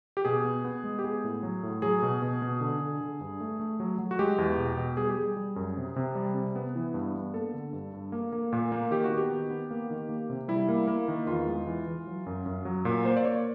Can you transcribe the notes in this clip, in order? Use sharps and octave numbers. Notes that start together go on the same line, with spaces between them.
G4
B2 G#4
B3
B3
G#3
G4
B3 G#4
A2
F#3
A2
F#3 G#4
B2
B2
B2
D3
D3
D3
G2
A3
A3
F#3
F#3
F#4
G#3 G4
E2
B2
B2
G3 G#4
G4
G3 G#4
G3
F#2
C3
C3
G3
C3
B3
E3
G2
B3
A#3 A4
D3
G2
G2
A#3
A#3
A#2
A#3
D#3 G4
F#4
B3
G4
D#3
B3
A#3
D#3
A#3
C3
G3 E4
A#3
A#3
D#3
E2 F4
G#3
E3
E3
F#3
F#2
F#2
F#3
A#2
A#3 C5
D5
A#3 C#5